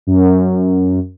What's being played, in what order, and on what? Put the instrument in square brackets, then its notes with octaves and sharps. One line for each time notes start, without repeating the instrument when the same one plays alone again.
[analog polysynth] F#2